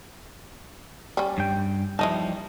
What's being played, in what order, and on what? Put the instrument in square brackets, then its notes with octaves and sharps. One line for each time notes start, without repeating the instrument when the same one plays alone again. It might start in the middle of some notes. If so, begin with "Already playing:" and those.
[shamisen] G3 C#4
[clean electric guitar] G2 G5
[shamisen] E3 D#5 A5 [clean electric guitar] F3 G3 D#4